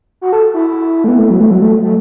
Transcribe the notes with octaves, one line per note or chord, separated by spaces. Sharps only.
F#4
A4
E4
A3
B3
A3
F#3
A3
F#3
A3
A3